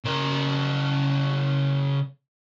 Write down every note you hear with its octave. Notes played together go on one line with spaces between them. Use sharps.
C#3 A#4